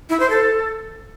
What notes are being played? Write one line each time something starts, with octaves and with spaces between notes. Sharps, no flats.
E4
C5
A4